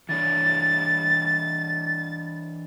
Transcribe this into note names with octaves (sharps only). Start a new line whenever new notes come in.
E3 D4 C#5 A6